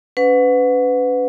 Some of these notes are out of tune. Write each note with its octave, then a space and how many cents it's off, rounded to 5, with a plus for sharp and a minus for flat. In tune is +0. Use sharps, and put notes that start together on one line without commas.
C#4 +30 B4 +25 F#5 -30